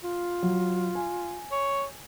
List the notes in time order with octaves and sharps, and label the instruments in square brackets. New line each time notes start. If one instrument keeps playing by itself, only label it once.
[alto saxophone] F4
[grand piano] F#3
G#5
[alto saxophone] C#5